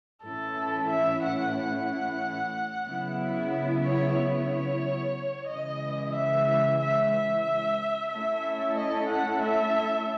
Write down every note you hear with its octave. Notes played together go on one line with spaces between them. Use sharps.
A2 E3 A3 C#4 E4 A4
E5
F#5
F#5
C#3 F#3 B3 E4
C#5
C#5
C#3 E3 G#3 D#5
E5
E5
E5
A3 C#4 E4 A4 E5
D#5
F#5
E5